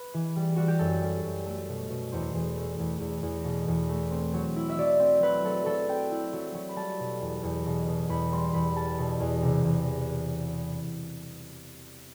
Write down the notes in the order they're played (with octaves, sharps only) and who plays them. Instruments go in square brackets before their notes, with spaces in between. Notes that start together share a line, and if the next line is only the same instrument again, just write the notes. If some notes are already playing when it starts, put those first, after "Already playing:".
Already playing: [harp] B4
E3
G3
G3 F#4
G4
F#2 A4
G3
F#2
A3
B2
B2
E2 C5
E2
A3
E2
E2
E2
B2
E2
A3
C4
F#3
E4
E5
F#3 D5
C4
F#3 B4
F#3 A4
F#3 A4
C4 G5
E4
F#3
F#3
B5
G3 A5
B2
E2
E2
B2
B2
E2 B5
G3 C6
E2 B5
G3 A5
B2
E2
C3
E2